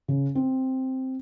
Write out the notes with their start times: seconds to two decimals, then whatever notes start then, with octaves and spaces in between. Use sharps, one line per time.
0.08 C#3
0.35 C4